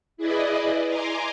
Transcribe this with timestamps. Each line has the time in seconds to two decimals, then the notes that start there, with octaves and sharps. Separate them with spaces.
0.17 E4 G#4 B4 D5 D#5
0.87 G#5 A#5 C6 D6